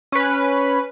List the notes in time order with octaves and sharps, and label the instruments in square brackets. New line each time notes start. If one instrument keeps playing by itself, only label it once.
[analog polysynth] C#4 B4